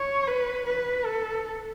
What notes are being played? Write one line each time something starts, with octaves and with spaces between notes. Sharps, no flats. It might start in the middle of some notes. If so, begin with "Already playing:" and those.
Already playing: C#5
B4
B4
A4